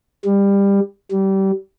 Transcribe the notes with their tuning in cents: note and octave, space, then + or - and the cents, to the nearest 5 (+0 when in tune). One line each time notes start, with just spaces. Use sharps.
G3 +20
G3 -25